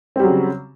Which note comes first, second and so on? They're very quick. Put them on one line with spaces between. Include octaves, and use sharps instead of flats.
C4 G3 F#3 C#3